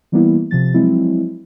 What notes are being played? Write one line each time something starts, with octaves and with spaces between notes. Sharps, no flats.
E3 G3 A#3 B3 E4
C3 F3 A6
F3 F#3 G#3 C4 E4